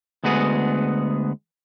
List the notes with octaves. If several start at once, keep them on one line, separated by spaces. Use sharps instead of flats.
D2 G#3 B3 F#4 G#4